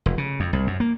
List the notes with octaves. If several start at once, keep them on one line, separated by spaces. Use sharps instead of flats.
F1
C#3
F2
C2
F#2
A#3